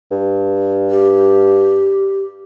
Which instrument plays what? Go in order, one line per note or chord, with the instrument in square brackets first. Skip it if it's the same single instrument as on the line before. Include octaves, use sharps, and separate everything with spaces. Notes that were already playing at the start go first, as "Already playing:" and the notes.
[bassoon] G2
[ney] G4